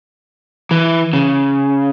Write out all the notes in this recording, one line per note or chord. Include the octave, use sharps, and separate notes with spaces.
E3
C#3